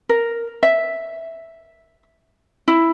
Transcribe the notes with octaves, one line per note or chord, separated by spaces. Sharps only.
A#4
E5
E4